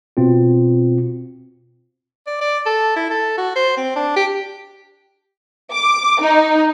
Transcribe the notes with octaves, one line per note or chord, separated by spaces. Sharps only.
B2 C4 F4
D5
D5
A4
E4
A4
F#4
C5
C4
D4
G4
D6
D#4